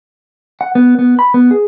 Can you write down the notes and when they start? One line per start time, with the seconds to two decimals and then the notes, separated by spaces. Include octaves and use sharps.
0.61 F#5
0.75 B3
0.99 B3
1.19 B5
1.34 B3
1.51 G#4